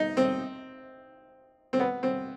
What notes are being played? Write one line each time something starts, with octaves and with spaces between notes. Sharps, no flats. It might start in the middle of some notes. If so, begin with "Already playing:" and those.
Already playing: D#4
C4
C4
B3
C4